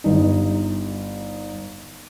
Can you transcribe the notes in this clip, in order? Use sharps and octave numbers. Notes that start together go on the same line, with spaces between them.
G1 D#4